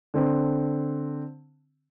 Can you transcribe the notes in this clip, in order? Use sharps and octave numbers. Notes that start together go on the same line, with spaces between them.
D3 C4